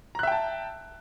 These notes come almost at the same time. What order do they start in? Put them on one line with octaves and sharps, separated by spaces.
A#5 F#6 E5 G5 A5